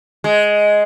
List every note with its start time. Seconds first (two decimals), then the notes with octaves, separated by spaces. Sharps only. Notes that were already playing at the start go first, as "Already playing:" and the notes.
0.24 G#3